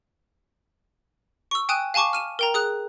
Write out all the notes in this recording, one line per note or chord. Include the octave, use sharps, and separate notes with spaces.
C#6 E6
G5 G#5 D#6 F#6 D#7 E7
F5 G#5 A5 C#6 D6
F6 D#7 E7
A#4 G5 A#5
G#4 D#6 F#6